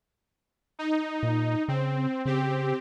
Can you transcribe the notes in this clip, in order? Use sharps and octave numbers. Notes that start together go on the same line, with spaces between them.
D#4
A#2
C#3 C4
C#3 C4 G4